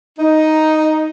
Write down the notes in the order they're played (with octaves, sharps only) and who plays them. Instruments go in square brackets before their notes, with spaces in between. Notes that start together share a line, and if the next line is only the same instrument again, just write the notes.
[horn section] D#4